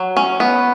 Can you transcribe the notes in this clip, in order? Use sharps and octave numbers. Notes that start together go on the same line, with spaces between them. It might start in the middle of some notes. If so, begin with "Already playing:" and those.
Already playing: F#3
C#4
B3